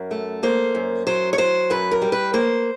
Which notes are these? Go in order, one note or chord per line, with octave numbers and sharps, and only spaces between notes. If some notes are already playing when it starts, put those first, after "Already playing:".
Already playing: F#2 A#4
A3
A#3 C5
F#2
F#3 C5
C#5
F#3 C5
F#2 B4
A#4
G3
B4
A#3 C5